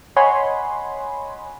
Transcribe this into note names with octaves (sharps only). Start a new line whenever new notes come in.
C#5 D#5 F#5 G#5 B5 C6